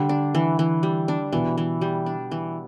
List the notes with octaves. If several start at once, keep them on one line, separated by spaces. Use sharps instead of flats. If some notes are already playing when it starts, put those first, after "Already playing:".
Already playing: D3 G3
D4
E3
E3
G3
D4
B2 E3
E3
G3
D4
E3